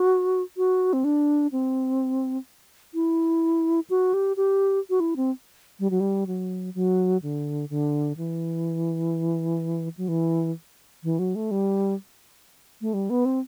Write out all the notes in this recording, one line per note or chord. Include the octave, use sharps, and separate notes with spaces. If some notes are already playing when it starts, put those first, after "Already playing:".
Already playing: F#4
F#4
C4
D4
C4
E4
F#4
G4
G4
F#4
E4
C4
G3
F#3
G3
F#3
F#3
D3
D3
E3
F#3
E3
E3
F#3
A3
G3
A3
G3
B3
C4